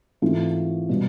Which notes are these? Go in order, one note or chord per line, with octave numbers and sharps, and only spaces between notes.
G#2 E3 A3 C4 F4
B2 G3